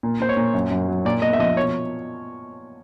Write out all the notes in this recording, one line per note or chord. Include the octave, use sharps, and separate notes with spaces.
A#2
A#2 C5
C#5
A#2
F#2
F#2
F#3
A#2 D5
A#2 D#5
E5
F3 D#5
B2 C#5